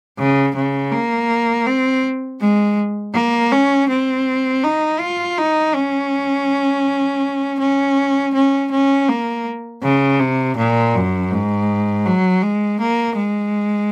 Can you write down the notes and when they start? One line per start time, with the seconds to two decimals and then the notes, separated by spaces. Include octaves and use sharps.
0.19 C#3
0.56 C#3
0.92 A#3
1.66 C4
2.40 G#3
3.14 A#3
3.52 C#4
3.89 C4
4.64 D#4
5.00 F4
5.38 D#4
5.74 C#4
7.60 C#4
8.34 C#4
8.71 C#4
9.09 A#3
9.82 C#3
10.20 C3
10.57 A#2
10.95 F#2
11.31 G#2
12.06 F#3
12.42 G#3
12.80 A#3
13.16 G#3